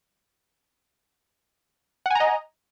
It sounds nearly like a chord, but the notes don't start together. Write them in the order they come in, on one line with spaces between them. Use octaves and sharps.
F#5 G#5 A#5 D#5